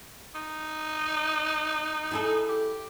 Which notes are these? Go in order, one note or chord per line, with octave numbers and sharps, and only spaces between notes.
D#4
E4 G#4 A4
G4